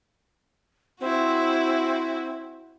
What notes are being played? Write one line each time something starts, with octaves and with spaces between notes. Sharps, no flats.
C4 E4 F#4